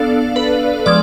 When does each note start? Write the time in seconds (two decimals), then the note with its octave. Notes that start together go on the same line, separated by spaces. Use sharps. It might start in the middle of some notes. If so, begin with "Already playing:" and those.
Already playing: B3 D4 A4 D5 F5
0.36 B4
0.86 F3 G#3 D5